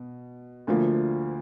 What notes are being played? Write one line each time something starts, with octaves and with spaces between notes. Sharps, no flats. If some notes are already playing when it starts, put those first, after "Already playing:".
Already playing: B2
D2 D3 F3 A#3 F4